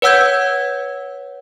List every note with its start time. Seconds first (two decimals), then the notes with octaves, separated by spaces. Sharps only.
0.02 B4 C#5 F#5 E6 G6 G#6